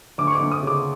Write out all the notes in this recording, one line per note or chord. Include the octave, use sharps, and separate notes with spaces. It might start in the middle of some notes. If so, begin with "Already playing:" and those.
D2 D6
C#6
D6
D2
D#6
C#3 D6